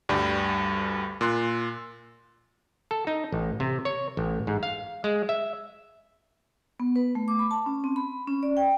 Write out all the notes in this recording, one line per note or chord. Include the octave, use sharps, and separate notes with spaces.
D2 G2 G3
A#2 C6 F#6
A4
D#4
A1
C3
C#5
A1
G#2
F5
G#3
E5
B3
B4
A3
D6
B5
A5
C#4
C4
B5
C#4
D5
G5